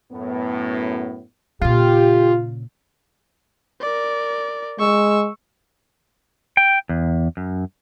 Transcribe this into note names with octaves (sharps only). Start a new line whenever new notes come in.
F#2 A2 B3
A#2 C#3 F4 G4
A#4 D5
G#3 C#6 E6
G5
E2
F#2